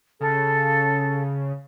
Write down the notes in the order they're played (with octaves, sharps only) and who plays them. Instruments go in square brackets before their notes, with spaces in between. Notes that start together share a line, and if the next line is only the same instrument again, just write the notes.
[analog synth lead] C#3 [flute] A4